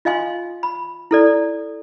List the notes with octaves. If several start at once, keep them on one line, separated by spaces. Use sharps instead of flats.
F4 D#5 F5 G#5 C6
B5
E4 A4 D5